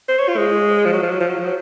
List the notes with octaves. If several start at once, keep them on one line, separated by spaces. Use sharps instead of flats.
C5
C#5
F4
G#3
F3
F#3
F3
F#3
F3
F#3
F3
F#3